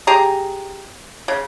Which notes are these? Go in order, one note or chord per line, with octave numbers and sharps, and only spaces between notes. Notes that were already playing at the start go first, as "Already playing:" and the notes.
G4 G#4 A#5
C#3